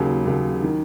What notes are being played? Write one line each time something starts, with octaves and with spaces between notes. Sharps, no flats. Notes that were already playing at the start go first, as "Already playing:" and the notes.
Already playing: D#2 C#3 F#3
D#2 C#3 F#3
D#3